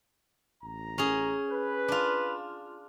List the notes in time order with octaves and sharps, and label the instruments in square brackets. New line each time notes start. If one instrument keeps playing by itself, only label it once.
[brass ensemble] A1 A#5
[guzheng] C#4 G#4
[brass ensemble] B4
[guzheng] D4 F4